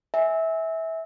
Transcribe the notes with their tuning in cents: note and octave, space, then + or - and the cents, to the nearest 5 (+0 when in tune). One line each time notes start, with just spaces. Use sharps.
E5 -20 G#5 -10